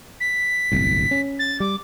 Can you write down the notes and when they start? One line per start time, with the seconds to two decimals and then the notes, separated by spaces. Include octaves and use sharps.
0.21 B6
0.72 D1 G1 C2
1.11 C#4
1.39 A6
1.60 G3 D6